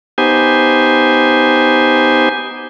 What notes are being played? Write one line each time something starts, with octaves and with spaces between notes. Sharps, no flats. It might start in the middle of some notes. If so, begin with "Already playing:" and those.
B3 D#4 G4 C5 G#5